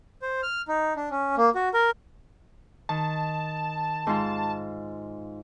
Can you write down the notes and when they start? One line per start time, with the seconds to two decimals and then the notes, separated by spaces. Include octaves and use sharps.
0.22 C5
0.43 F6
0.68 D#4
0.96 D4
1.11 C#4
1.37 A#3
1.55 F#4
1.74 A#4
2.89 D#3 A5
4.07 G#2 F4